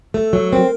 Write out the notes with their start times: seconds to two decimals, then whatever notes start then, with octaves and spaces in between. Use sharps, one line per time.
0.14 A3 A4
0.33 F#3
0.52 C4 A#4